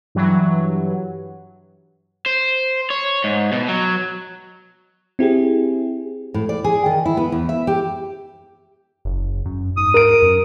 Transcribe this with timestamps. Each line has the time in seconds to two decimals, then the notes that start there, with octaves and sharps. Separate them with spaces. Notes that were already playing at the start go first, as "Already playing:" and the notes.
0.15 G2 E3 F#3
2.26 C5
2.90 C#5
3.24 G#2
3.52 B2
3.69 F#3
5.19 C4 E4 G4 G#4
6.34 A2
6.49 D5
6.64 G#4
6.86 D#3
7.06 E4
7.17 B3
7.32 E2
7.49 E5
7.67 G4
9.05 F#1
9.45 F#2
9.77 G#2 D#6
9.94 A#4 D7
10.22 F#2